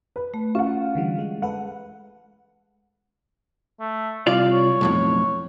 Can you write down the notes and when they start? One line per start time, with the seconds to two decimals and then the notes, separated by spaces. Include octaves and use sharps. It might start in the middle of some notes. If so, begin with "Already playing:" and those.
0.16 B4
0.34 A3
0.55 C#4 F4 F#5
0.95 D3 E3 G3
1.18 G#3
1.42 G#3 A4 B4 F#5
3.80 A3
4.27 C2 F4 D5 F5
4.52 C#5
4.81 B1 F2 A2